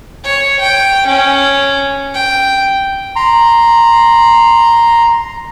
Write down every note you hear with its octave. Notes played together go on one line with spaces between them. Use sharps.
C#5
G5
C#4
G5
A#5 C6